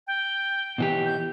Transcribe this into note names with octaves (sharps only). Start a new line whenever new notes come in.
G5
B2 E3 G4
G6